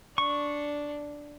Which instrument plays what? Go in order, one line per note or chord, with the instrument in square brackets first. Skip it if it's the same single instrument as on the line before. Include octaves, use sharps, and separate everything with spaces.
[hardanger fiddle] D4 [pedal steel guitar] C#6